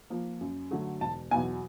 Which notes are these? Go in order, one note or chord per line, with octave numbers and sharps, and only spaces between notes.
F3 A#3
F#2
D3 F#3 A3
E1 A5
E2 B2 F#3 B3 G#5